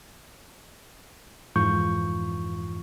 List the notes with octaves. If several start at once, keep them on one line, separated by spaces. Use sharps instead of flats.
F2 G#2 E3 F4 C#6 G6